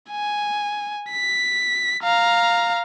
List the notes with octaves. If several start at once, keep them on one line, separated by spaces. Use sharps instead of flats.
G#5
B6
F5 A#5